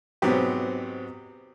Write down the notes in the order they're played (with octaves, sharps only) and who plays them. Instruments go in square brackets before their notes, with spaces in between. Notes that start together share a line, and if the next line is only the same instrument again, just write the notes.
[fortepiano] G#2 B2 F#3 B3 C4 G4